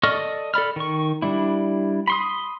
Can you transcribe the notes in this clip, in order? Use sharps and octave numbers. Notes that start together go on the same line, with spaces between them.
A4 D5 D#5 C#6 F6
A4 D5 B5 F6
D#3 C#6
G3 D4 E4
B5 C6 D#6